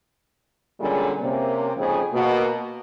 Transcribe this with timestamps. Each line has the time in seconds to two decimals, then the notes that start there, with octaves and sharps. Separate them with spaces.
0.80 A#2 D3 G3 G#3 C#4 G#4
1.20 C3 A#3 C#4
1.77 F2 G#2 C#3 G#4
2.13 B2 A#3 F#4